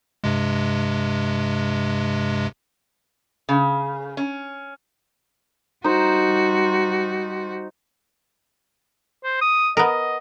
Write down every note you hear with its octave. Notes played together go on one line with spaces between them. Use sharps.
G2 C3 G#3
C#3
C#4
G3 D#4 F#4 C5
C5
D#6
B3 A#4 D#5